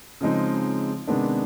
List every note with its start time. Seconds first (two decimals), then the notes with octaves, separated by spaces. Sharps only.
0.21 C#3 F3 G#3 C4 D#4
1.07 C3 D#3 G#3 B3 D4